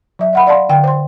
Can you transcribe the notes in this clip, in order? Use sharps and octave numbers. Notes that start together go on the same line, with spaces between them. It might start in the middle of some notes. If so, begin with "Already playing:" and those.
F#3 E5
D#5 F#5 B5
D5 F5 A5 C6
D3 F5 G5
C5 C6